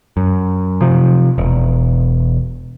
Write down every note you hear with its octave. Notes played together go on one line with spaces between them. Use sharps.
F#2
C3 F3
E1